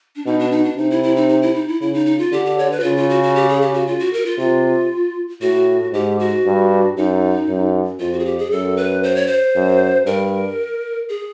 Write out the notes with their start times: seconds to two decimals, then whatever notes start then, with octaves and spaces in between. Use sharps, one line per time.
0.16 D4
0.26 B2 D#4
0.39 D4
0.52 D#4
0.65 D4
0.77 C3 D#4
0.91 E4
1.04 E4
1.16 D#4
1.29 D#4
1.42 E4
1.55 D#4
1.68 E4
1.81 C#3 E4
1.94 D#4
2.06 D#4
2.19 F4
2.32 D3 G4
2.45 G4
2.59 C#5
2.71 B4
2.80 F#4
2.83 C#3 F4
2.97 F4
3.10 F#4
3.23 F#4
3.35 G4
3.49 G#4
3.62 G4
3.74 F#4
3.87 F4
4.00 F#4
4.13 A#4
4.26 F4
4.38 C3 F4
5.42 A2 F#4
5.93 G#2 G4
6.19 F#4
6.46 G2
6.97 F#2 D#4
7.49 F#2
8.00 F2 F4
8.13 F#4
8.20 G#4
8.26 G4
8.38 G#4
8.52 F#2 A4
8.77 B4
9.03 C5
9.16 C#5
9.27 C5
9.55 F#2
10.06 G2 A#4
11.09 G#4